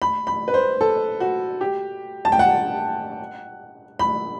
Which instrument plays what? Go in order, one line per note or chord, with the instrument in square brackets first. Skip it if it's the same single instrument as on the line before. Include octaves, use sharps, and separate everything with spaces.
[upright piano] B5
B5
B4
C5
A4
F#4
G4
A5
G5
F#5
B5